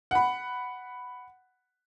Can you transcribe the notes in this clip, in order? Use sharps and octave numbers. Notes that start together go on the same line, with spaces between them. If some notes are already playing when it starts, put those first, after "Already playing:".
F#5 B5